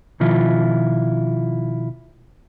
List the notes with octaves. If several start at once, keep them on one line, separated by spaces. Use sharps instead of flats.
B2 D#3 F3 E4 F4